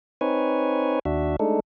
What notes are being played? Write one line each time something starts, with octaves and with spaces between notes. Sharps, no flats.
C4 D#4 B4 C#5 G#5
D#2 D4 F#4 E5
G#3 A3 D4 D#4 A4